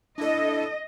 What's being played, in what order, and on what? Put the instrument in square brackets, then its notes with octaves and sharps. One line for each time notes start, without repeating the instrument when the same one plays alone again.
[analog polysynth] D4 E4 A4 [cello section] D#5